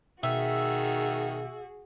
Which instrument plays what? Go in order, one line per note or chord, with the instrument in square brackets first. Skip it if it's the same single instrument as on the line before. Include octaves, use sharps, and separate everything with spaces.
[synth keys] B2 [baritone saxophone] D#3 [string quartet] F#4 G#4 [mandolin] E5